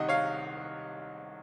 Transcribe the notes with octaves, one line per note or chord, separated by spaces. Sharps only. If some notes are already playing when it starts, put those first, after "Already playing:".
Already playing: C2 C3 D#3 D#5 F#5
C#5 F5